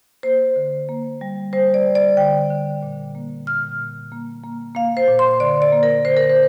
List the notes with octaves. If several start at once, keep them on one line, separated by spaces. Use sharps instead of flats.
A#3 C5
D3
A#3
G3
G3 C5
D5
G3
D5
D3 G5
D3
A#2
A#3
A#2 F6
A#2
A#3
A#3
A#3 F5
C5
A#2
C6
D3 D5
D5
A#3
A#4
D3 C5
A#4
C5